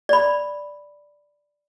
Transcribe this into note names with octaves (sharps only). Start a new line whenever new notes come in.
D5 B5